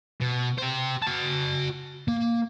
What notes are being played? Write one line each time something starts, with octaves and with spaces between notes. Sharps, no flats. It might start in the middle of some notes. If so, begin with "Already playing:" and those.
B2
G4 C5
F#4 A5
A#3